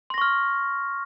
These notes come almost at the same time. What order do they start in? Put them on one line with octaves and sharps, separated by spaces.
C6 A#6 C#6 F6